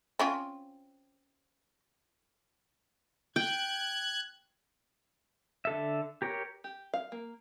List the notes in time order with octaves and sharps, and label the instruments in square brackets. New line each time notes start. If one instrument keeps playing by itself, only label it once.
[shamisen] C4 C#4 F4
[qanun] G5 [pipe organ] F#6 G#6
[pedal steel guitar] D3 A4 E5
G4 A#4 C#5
[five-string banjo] G4
F5
A#3